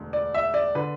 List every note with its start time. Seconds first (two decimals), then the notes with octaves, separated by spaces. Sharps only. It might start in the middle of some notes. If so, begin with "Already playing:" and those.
Already playing: E1 D2
0.13 D5
0.34 E5
0.54 D5
0.75 D3 B4